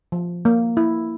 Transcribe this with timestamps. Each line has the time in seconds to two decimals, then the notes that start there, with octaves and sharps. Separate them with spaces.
0.12 F3
0.45 A#3
0.77 E4